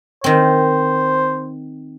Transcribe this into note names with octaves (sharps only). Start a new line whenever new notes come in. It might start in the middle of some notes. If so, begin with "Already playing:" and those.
D#3 C4 C5